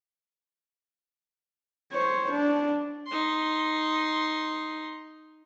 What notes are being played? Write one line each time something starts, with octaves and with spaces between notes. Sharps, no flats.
C5 C#5
D4
D#4 C6